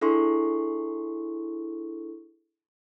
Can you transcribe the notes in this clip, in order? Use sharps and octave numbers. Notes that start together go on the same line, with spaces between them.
D4 E4 G#4 A4 C6 C#6